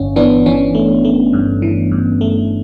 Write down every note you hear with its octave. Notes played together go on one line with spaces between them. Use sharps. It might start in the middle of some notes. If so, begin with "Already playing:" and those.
Already playing: G1 C#4
E3 B3 D4
E3 C#4
A3
A3
G2
E3
G2
A3